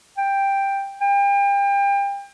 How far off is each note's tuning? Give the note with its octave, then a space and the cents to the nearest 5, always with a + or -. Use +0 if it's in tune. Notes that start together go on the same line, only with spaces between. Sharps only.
G5 +5
G5 +35